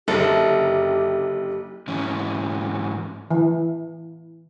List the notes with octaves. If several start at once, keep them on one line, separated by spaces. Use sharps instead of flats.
F#1 D3 A#3 G4 A4 A#4 E5
G#2 E3 C#4
E3